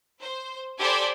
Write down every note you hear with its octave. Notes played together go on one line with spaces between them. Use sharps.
C5
G4 A4 C5 D5 G#5 B5